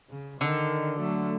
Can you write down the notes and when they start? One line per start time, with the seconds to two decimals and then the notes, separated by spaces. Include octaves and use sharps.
0.10 C#3
0.41 D3 D#3
1.00 F#3 A3